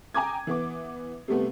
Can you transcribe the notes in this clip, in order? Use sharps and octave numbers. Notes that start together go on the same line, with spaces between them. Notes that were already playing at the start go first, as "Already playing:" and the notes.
G5 G#5 A#5 D6 D#6 G#6
E3 B3 D6
C3 G3 A3 B3